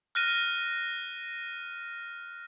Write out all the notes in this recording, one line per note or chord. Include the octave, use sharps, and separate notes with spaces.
F6 F#6 A#6 D#7